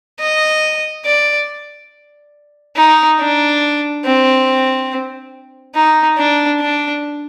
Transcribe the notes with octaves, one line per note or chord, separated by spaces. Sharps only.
D#5
D5
D#4
D4
C4
D#4
D4
D4